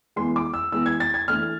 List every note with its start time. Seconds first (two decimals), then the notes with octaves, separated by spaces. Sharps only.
0.16 E3 G#3 B3 C6
0.36 D6
0.54 E6
0.72 E3 G#3 B3 E6
0.86 G#6
1.00 A6
1.14 G#6
1.28 E3 A3 D4 F6